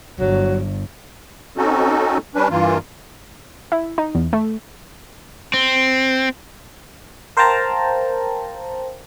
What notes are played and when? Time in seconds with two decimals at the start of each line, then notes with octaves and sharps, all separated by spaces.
0.19 G1 F#3
1.57 C4 C#4 D#4 F#4 A4
2.35 G3 C#4 D4 B4
2.50 G2 E3 A#3 F4
3.72 E4
3.98 D#4
4.15 E2
4.33 A3
5.54 C4
7.37 A#4 C5 F5 G5 A5 A#5